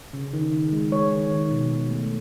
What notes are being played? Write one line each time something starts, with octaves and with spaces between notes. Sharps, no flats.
C#3
D#3
D#3
G#3
G#3 C#5
D#3
D#3
B2
B2
A3